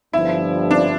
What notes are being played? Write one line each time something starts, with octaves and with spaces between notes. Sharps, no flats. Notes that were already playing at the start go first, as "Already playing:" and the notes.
G1 G2 F3 E4
D4